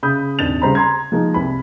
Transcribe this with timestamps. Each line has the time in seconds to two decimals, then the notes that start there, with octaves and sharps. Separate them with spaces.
0.03 C#3 B5 D#6 G6
0.39 D#1 G#1 D4 A6 F7
0.62 C#3 G3 C5 A#5 B5
0.75 A#5 C6 G#6
1.12 F3 G#3 A#3 D#4
1.34 C2 B5